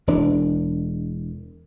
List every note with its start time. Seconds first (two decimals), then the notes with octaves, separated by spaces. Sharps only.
0.07 E1 D4